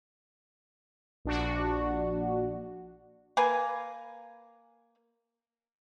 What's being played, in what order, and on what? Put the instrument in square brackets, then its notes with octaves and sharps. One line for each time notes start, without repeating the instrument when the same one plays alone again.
[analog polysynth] A#1 D4 F#4
[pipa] A#3 B4 G#5